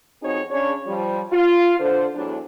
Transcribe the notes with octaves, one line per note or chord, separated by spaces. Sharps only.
F2 C4 D#4 F#4 G#4 C#5
C#3 D4 C#5
F3 G3
F4
D3 C5
E2 A2 F#3 D4